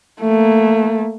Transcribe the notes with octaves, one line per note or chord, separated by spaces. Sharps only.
A3 A#3